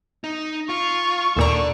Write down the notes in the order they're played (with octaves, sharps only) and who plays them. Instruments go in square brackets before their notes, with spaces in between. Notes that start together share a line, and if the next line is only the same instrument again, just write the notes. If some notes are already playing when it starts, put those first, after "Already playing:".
[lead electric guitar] D#4
[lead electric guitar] F4 [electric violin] C#6
[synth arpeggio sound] D#2 A#2 A#5 [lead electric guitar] A4 D5